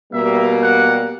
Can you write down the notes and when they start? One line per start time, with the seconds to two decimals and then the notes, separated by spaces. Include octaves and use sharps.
0.13 B2 G3 A#3 E5
0.63 F#5